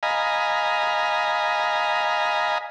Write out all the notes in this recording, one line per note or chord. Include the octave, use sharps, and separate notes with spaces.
D#5 F5 G#5 A#5 B5